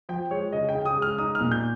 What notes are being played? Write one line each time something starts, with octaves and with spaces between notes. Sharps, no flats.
F3 G5
G#3 C#5
C#3 D#5
G5
C#3
D#6
G#3
F6
D#4 D#6
F6
A#2
G6